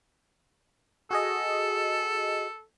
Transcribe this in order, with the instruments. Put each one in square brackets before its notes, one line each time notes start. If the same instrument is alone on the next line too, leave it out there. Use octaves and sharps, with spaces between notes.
[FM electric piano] F#4 G#4 D#5 [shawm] A4